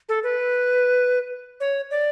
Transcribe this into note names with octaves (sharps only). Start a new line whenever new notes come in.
A4
B4
C#5
D5